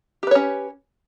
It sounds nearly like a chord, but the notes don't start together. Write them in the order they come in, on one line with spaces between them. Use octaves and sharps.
G4 B4 C#5 C#4